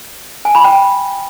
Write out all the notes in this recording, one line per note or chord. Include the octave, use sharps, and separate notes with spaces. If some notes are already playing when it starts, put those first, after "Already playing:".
G#5
B5
G5